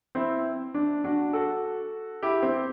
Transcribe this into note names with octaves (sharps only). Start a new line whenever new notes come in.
C4 E4
D4
D4 F#4
F#4 A4
E4 G4
C4